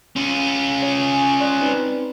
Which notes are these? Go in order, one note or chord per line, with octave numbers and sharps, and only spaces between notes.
C#4 F4
C#5
G#5
D5 C6 F#6
C4 D#4 B4